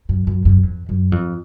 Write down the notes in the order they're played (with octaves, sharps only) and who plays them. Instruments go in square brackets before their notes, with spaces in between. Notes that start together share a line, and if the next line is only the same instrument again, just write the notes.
[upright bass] F#2
F#2
F#2
F2
F#2
F2